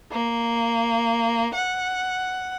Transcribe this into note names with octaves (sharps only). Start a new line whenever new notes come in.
A#3
F#5